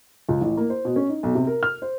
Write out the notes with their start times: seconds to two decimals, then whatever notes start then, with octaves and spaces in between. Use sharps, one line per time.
0.29 C#2
0.41 A1
0.57 A#3
0.70 C5
0.85 B2
0.96 C#4
1.09 D#4
1.23 B1
1.35 C3
1.47 A#4
1.63 F6
1.82 C5